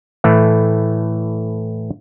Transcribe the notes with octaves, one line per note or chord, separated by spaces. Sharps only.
A2 E3 A3